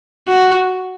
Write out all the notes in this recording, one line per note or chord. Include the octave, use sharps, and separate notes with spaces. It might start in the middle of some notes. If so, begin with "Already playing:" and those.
F#4